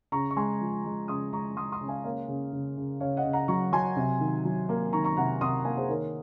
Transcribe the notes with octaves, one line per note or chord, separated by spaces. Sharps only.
C#3 A#5 C#6
C#6
G#3 G#5 C6
F3
G#3
C#3 C6 D#6
G#3 A#5 C#6
G#3 C6 D#6
C6 D#6
C#3
F5 G#5
A#3 C#5 F5
C#3
C#3
C#3
C#3 C#5 F5
D#5 F#5
C#3
F#5 A#5
F#3 A#5 C#6
F#3 G#5 C6
C3
D#3
F#3
A#3
D#3 A#5 C#6
A#5 C#6
C3 F#5 A#5
C3 C6 D#6
A#3 F5 G#5
G#4 C5
D#3 A#4 C#5